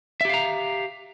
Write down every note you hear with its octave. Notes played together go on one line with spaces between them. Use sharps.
G4 E5 F5 A#5